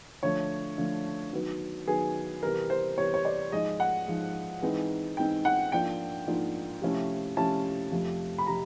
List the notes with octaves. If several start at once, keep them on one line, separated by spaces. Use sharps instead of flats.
D3 F3 A3 C#5
D3 F3 A3
D#3 F#3 B3
D#3 F#3 B3 G#4
C3 E3 G3 B3 A#4
C5
C3 E3 G3 B3 C#5
C#5
D5
G#2 F3 G#3 D#5
F#5
G#2 F3 G#3
G#2 E3 G#3 C4 D#4
G#2 E3 G#3 C4 D#4 G5
F#5
G#2 F3 A#3 D4 F4 G5
G#2 F3 A#3 D4 F4
C3 F3 A3 C#4 E4
C3 F3 A3 C#4 E4 A5
F2 C3 F3 A3
B5
C3 F3 A#5